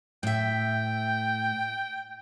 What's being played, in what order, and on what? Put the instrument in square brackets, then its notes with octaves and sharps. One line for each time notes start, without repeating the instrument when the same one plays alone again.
[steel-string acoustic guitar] A2 E5 [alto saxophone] G5